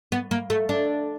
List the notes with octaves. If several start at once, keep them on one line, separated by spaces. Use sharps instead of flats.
B3
A#3
A3
D4